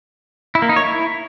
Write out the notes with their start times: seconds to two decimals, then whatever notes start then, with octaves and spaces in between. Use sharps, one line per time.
0.55 E4
0.62 A#3
0.69 D#4
0.76 C#5
0.84 E4